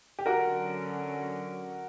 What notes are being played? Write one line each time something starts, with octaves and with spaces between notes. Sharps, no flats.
G4
D3 F#3 C#4 F#4 A#4